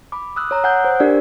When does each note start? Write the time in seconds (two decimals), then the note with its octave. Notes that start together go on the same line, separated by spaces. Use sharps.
0.12 B5 D6
0.36 D#6 E6 F#6
0.51 C#5 A#5
0.64 F#5 G#5 D#6 E6 F#6 G6
0.85 C5
1.00 D4 G4 A#4 D5